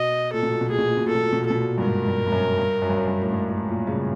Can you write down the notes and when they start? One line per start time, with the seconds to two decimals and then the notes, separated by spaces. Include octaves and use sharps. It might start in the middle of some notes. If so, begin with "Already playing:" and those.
Already playing: B2 D#5
0.33 A#2 A4
0.43 B2
0.52 A#2
0.61 B2
0.70 A#2 G#4
0.79 B2
0.88 A#2
0.97 B2
1.06 A#2 A4
1.15 B2
1.24 A#2
1.33 B2
1.41 A#2
1.46 B2 A4
1.60 A#2
1.78 G2
1.82 G#2 A#4
2.08 G2
2.26 G2
2.32 F#2
2.57 G2
2.82 F#2
2.90 G2
2.97 F#2
3.07 G2
3.22 A2
3.31 G#2
3.51 A2
3.69 A#2
3.87 C#3